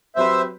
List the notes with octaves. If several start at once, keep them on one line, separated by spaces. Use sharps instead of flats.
F#3 C4 G4 B4 C5 E5